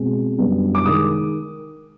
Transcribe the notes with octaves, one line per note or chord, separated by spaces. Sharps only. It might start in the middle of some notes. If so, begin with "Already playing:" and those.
Already playing: B2 G#3 C4
F#2 D3 G3 B3
D6
D#3 G#3 D#6